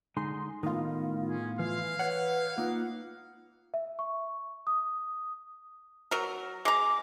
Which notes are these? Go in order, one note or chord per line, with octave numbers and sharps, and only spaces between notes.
D3 G#3 D#4 C6
A2 D#3 B3 D#4 F4
C#4 G#4
E3 E4 F5
B4 C#5 F#5
A#3 D#4 F4
E5
C#6
D#6
F#3 A#4
G#3 A#5 D6